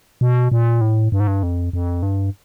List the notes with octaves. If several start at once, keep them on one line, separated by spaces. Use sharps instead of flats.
B2
A#2
A2
G2
G#2
G2
F2
F2
G2